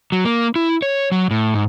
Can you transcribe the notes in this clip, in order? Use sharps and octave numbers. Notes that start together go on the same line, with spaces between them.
F#3
A#3
E4
C#5
F#3
A2
G#2